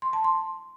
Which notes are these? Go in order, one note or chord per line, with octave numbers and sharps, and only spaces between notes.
C6
A5
C6